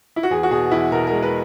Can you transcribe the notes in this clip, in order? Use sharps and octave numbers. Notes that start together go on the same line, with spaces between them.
E4
F#4
E2 G#4
F#4
B2 G#4
E2 E4
B2 A#4
G#3 A#4
B4